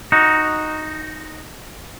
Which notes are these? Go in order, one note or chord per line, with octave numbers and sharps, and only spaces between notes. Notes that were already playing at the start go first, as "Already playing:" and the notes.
D#4 F#4